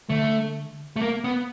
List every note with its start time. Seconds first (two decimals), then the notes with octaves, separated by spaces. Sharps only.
0.09 D3 A3
0.96 A3
1.01 A#3
1.24 B3